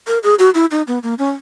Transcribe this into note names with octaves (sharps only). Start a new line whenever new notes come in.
A#4
G#4
F#4
E4
D#4
B3
A#3
C#4